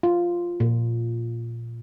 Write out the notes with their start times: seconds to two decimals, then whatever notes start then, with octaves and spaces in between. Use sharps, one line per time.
0.03 F4
0.60 A#2